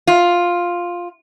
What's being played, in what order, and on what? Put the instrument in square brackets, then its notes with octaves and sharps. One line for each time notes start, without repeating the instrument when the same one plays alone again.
[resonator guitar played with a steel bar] F4